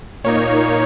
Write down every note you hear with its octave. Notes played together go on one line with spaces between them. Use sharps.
A#2 A#3 D#4 C#5